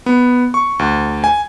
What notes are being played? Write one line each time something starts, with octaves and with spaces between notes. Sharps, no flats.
B3
C#6
D2
G#5